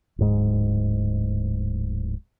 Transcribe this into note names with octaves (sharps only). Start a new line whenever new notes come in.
D1 G#2 G#3